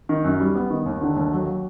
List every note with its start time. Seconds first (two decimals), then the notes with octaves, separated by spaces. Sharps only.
0.09 D#3
0.24 F#2
0.39 G3
0.55 B3
0.70 D#3
0.86 D#2
1.01 D3
1.16 D#2
1.32 F#3